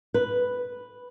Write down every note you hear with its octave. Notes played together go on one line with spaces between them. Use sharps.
B4